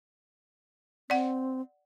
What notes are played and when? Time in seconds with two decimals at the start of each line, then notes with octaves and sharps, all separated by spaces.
1.10 C4 D5 F#5